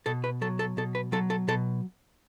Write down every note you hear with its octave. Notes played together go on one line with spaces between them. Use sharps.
B2 A4
B4
F#3 A4
A4
B2 A4
B4
F#3 A4
A4
B2 A4